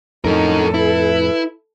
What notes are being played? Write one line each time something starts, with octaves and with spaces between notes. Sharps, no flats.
F2 A2 C#4 D#4 A4 A#4
E4 B4